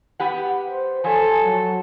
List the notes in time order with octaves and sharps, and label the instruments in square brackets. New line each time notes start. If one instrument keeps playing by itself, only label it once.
[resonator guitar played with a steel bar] B3 G4 F#5
[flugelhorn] C5
[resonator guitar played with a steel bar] F3 C#5 [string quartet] A4 [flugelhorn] G#5
[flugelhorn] F#3